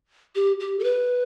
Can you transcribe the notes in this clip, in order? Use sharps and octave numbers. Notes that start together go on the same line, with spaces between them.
G4
G4
A4
B4